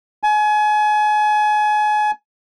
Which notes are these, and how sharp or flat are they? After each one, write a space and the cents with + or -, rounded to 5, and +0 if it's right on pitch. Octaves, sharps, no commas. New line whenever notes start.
G#5 +30